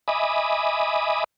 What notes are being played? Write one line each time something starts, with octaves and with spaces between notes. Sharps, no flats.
D#5 E5 G#5 B5 D6 D#6